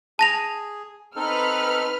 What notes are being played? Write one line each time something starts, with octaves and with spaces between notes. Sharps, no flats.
G#4 A5 A#6 F7
C4 D#4 A4 B4 F6